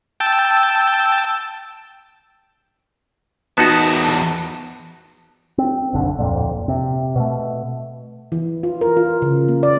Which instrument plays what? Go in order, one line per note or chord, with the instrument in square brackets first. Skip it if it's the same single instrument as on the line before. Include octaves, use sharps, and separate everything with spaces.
[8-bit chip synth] G5 A5 E6
[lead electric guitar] E2 A5 [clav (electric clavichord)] B3 D#4 F#4
[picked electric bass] C4
F#1 B1 D3
D1 F2 A#2
C3
B2 A3
[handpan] E3
F4
A#4
F4
C#3
A#3
D5